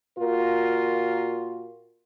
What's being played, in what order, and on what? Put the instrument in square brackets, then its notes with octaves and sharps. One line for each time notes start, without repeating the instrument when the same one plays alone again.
[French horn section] A#2 F4 F#4 A#4